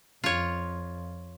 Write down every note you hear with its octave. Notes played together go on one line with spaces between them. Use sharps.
F2 F4 C#5